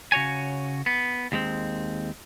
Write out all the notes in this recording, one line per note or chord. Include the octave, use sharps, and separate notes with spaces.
C#3 F#4 C#5 G#5
B3
D#2 G#3 C4